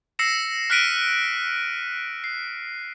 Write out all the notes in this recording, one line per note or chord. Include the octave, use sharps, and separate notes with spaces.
E6 A#6 C7 C#7 E7
F6 F#6 B6 D7 D#7
C7